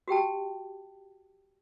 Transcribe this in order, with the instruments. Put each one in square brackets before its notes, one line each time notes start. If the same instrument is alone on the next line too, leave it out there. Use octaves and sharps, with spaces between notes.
[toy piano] F#4 G4 G5 A5